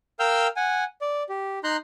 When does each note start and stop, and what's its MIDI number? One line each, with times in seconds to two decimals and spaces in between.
0.20 0.47 70
0.20 0.47 77
0.20 0.47 79
0.20 0.47 88
0.20 0.47 89
0.20 0.47 91
0.56 0.84 78
0.56 0.84 80
1.01 1.23 74
1.29 1.59 67
1.64 1.77 63
1.64 1.77 82
1.64 1.77 84
1.64 1.77 90
1.64 1.77 91